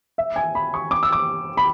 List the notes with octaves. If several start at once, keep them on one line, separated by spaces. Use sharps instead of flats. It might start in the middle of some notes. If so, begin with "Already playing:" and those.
E5
G#5
B5
C#6
D6
E6
D6
B5